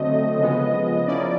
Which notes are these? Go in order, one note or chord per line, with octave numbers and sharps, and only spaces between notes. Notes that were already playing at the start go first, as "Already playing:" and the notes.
Already playing: D3 F#3 A3 C4 D#5
C#3 F3 G#3 B3
F3 A#3 C#4 E4 D5